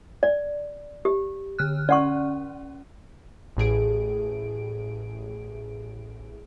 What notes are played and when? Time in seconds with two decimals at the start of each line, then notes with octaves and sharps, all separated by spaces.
0.23 D5
1.05 G4
1.59 D3 F6 F#6
1.89 C#4 D5 F#5 C#6
3.57 A1 A2 G#4 D7